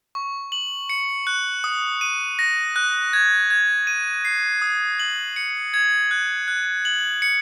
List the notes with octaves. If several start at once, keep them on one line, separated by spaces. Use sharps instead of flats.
C#6
F#7
C#7
F#6
D#6
D#7
A#6
F#6
G#6
G#6
D#7
C7
D#6
F#7
C#7
G#6
F#6
F#6
F#7
C#7